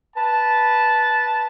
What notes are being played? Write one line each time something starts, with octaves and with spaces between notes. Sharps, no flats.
B4 A5